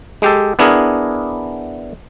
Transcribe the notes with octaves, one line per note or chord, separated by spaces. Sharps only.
G#3 G4 A4
B3 D4 E4 G#4 A#4